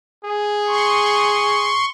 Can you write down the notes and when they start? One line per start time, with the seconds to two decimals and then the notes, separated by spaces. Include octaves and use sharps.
0.24 G#4
0.67 C6 C#6